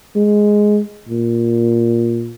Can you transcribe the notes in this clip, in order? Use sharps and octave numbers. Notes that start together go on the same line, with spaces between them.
G#3
A#2